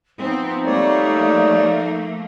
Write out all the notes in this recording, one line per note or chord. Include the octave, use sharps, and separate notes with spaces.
F3 B3 C4 D#4
F3 G3 A3 A#3 C#5 D5